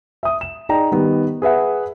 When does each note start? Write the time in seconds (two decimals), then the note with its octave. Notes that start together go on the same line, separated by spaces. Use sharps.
0.23 E5 D#6
0.41 E7
0.69 D#4 G#4 D5 G5 A#5
0.92 D#3 G3 B3
1.42 G#4 B4 E5 F#5